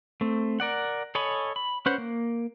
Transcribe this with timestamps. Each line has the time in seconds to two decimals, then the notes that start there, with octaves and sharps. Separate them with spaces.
0.21 A3 C4
0.60 A#4 D5 F#5
1.15 A4 C#5 D#5 G#5 B5
1.56 B5
1.86 C#4 B4 C5 F#5
1.98 A#3